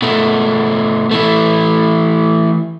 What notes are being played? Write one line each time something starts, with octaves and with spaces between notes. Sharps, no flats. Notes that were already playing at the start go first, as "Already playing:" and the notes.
B2 A3
E3 A3